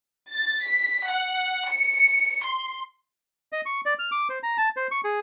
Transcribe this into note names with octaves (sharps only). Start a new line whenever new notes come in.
A6
B6
F#5
C#7
C6
D#5
C#6
D5
F6
D6
C5
A#5
A5
C5
C#6
G#4